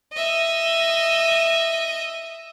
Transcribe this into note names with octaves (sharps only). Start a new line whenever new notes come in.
D#5 E5